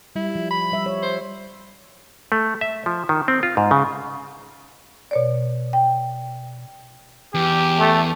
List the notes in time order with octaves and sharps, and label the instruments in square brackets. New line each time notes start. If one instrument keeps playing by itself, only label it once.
[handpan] G3 [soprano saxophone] E4
[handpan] F3
[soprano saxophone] B5
[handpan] G3 E5
C#5
[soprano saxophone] C5
[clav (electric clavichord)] A3
E5
F3
D#3
C4
F4
G#2
C#3
[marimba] B2 C#5 D5
G5
[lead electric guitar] E2 [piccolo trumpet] G4
[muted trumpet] A3